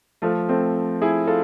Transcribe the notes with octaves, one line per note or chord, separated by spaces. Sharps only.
F3 A3
A3 C4
E4 G#4
F4 A4